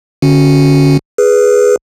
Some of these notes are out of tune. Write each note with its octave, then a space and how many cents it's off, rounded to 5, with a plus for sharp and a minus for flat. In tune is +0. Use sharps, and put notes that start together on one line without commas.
D3 +0 C#4 +0 F#4 -10
G#4 +0 B4 +0